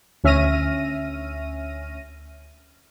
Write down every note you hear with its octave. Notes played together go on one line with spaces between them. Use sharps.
D2 C#4 E5 F6 A#6 D#7